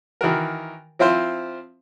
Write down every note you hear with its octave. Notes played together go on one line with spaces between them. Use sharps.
D#3 E3 F#4 A#4
F3 C4 E4 F4 C5